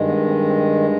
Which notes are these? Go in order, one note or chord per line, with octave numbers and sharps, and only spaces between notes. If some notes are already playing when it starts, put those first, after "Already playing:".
Already playing: G2 D#3 G#3
B3
C4
C4